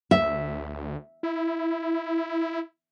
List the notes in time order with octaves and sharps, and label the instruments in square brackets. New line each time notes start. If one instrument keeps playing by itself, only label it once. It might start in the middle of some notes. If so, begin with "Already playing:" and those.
[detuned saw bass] D2 [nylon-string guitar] E5
[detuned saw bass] E4